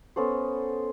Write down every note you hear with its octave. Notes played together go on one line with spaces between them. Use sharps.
B3 C#4 A4 C5